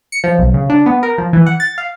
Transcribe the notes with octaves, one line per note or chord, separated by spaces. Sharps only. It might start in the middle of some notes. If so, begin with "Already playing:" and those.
C#7
F3
B1
C#3
D4
B3
A#4
F3
E3
F#5
A6
F5